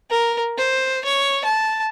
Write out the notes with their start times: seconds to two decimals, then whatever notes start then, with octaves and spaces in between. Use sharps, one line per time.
0.10 A#4
0.58 C5
1.04 C#5
1.45 A5